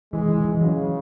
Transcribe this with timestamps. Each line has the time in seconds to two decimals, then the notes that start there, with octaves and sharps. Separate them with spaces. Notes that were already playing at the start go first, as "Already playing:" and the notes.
0.13 E3 G#3
0.29 E3
0.45 E3
0.61 C#3 F#3